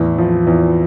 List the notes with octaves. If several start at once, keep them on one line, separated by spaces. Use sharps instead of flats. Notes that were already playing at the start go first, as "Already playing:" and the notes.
Already playing: E2 A2
F3
E2